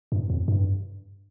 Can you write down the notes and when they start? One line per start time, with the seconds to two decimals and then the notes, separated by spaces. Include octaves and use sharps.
0.12 G2
0.30 F2
0.48 G2